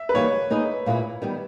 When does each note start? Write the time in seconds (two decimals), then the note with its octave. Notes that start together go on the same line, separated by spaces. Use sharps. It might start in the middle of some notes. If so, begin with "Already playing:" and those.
Already playing: E5
0.09 B4
0.14 E3 G3 A#3 D#4 C#5
0.50 A#3 D#4 G#4 B4 D#5
0.86 A#2 A#3 E4 G#4 B4
1.22 D#3 G3 B3